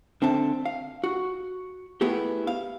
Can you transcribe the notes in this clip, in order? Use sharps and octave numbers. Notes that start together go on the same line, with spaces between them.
D3 C4 E5 A5
F5
F#4
A3 B3 E4 G4 G#4
F5